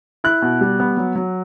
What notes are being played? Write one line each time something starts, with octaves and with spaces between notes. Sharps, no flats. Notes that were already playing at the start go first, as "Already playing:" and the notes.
E4 F#6
B2
G3
B3
F#3
F#3